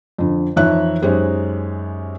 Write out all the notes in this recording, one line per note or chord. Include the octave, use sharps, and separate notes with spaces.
F2 D3
F2 E3 D#4 C#5 E5 F#6
F#2 G#3 D#4 G4 C5 C#5